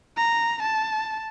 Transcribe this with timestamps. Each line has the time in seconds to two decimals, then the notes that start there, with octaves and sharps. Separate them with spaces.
0.17 A#5
0.63 A5